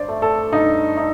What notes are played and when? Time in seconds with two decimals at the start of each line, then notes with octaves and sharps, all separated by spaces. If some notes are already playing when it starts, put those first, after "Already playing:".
Already playing: G2 C5 D5
0.08 A3
0.22 A4
0.52 G2 D#4
0.98 D#4